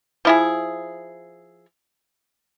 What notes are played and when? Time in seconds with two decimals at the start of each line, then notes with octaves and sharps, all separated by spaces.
0.25 F3 E4 G#4